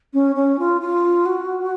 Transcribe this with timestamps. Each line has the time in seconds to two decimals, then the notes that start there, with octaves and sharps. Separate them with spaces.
0.13 C#4
0.35 C#4
0.59 F4
0.81 F4
1.26 F#4